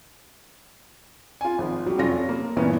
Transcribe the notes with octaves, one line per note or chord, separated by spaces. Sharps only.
F4 G#5
G#1 F3
F#3 G3
F1 C#4 F4 A#6
A#3
G2 A#2 E3 B3 C#4